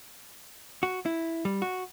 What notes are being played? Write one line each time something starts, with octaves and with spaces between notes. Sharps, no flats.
F#4
E4
G3
F#4